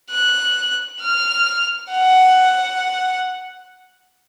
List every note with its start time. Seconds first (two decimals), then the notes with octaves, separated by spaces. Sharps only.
0.11 F#6
1.01 F6
1.91 F#5